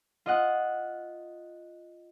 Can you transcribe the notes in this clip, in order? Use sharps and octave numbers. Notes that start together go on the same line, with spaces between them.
F4 D#5 F#5